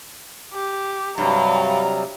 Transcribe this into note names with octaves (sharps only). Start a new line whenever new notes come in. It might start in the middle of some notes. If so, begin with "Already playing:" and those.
G4
G2 C3 F#3 G3 A#5